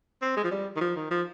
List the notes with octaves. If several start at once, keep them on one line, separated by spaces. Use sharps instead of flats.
C4
G#3
F3
G3
D#3
F3
D#3
F3